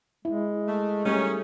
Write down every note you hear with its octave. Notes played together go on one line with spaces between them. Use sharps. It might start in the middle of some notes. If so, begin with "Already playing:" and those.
G#3 E4
A3
D#3 G3 A3 C#4 G#4